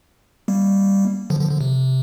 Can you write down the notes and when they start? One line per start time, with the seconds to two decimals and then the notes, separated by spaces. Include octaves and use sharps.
0.48 G3 A#3
1.30 D3 F3
1.40 D3 F3
1.51 D3
1.61 C3